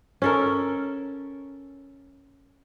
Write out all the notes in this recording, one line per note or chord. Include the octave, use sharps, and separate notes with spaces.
C#4 A4 A#4